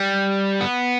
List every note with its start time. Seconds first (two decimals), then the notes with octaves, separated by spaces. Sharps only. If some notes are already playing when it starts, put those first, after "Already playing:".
Already playing: G3
0.61 B3